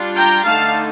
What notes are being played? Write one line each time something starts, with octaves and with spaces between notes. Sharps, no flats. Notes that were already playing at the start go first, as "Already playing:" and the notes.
Already playing: G3 D4 F4
G5 A#5
D3 A3 D#4 F5 A5